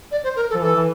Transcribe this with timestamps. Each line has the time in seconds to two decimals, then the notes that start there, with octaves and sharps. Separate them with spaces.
0.11 D5
0.23 C5
0.36 A#4
0.49 A4
0.54 F3
0.62 E3 A4
0.76 E3